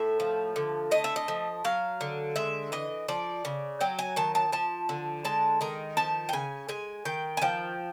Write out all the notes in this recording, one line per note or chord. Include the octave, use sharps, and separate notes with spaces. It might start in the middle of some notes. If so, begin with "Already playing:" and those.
Already playing: A2 E5
F3
D3
A3 D#5
E5
D#5
F3
F#3 F5
D3
G#3 E5
E3 D#5
F3 D5
C#3
F#3 G5
G#5
D#3 A5
A5
F3 A5
D3
G#3 A5
D#3 A#5
F3 A5
G5
C#3 G#5
G#3 G#5
D#3 G5
G#5
F3 G5